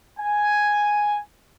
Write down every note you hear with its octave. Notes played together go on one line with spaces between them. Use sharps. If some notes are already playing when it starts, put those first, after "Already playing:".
G#5